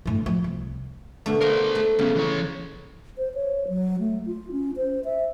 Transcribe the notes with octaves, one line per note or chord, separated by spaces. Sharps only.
G1 A2
F3
C2
B2 D3 A3
A#4 C5 D#5 F5
A3
C2 C#3 B3
E3 C#5
C5
C#5
F#3
A3
F4
C#4
C5
E5